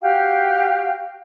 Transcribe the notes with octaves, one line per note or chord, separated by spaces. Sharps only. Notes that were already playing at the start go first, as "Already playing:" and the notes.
F#4 G4 F5 G5